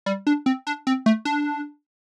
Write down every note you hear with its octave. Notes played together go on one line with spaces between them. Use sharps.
G3
D4
C4
D4
C4
A3
D4